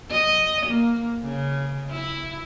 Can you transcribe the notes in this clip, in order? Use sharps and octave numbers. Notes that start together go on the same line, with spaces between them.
D#5
A#3
C#3
E4